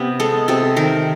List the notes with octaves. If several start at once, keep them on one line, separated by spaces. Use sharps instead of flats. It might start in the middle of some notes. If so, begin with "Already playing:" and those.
Already playing: C3 B3
G#3 A4
C3 A4
D#3 A#4